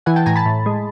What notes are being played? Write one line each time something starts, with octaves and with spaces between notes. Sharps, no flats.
E3 F#5 G#5
G5 A5
A2 G#5 A#5
A5 B5
A2
G#3